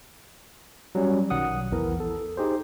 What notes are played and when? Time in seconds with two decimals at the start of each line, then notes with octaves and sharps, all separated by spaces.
0.95 F#3 G3 C#4
1.30 B1 D#3 F#5 D#6
1.71 A#1 E2 E3 A#4
2.00 A4
2.37 D#4 G4 G#4 C5